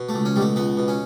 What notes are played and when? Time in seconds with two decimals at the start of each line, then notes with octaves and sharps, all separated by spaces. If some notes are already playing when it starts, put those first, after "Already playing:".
Already playing: B2
0.09 A3
0.14 C#2
0.25 C#4
0.36 B2 G3
0.41 A3
0.56 C#2 B3
0.77 B2
0.88 C#4